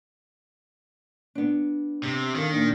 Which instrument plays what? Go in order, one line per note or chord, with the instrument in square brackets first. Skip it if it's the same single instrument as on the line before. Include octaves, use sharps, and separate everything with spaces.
[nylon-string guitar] B3 D4
[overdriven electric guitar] C3
[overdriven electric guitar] D#3 [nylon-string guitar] A4 A#4 F5
[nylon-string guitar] A#2 D4